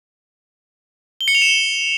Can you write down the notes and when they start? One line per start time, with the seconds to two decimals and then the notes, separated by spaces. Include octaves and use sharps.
1.21 G7
1.28 C#7
1.35 F7
1.42 E7
1.49 G7